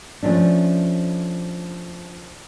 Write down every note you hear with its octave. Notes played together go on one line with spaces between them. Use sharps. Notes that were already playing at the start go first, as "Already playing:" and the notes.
F3 A3 C#4 D4